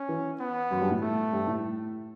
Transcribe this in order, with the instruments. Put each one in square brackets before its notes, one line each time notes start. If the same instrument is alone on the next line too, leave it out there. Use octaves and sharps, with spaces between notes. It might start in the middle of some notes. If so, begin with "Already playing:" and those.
Already playing: [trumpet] C#4
[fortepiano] E3
[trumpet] B3
[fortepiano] F#2
G2
A2
[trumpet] A3
[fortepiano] G2
A2